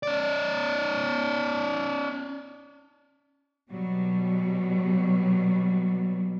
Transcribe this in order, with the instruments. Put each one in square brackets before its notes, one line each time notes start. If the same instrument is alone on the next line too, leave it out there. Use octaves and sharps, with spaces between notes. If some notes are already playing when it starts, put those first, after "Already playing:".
[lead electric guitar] C#4 D5
[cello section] B2 F#3 G3